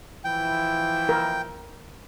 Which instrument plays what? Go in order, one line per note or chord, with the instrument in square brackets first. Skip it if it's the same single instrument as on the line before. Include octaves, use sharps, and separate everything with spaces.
[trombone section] E3 F3 E4 [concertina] G5
[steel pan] A#4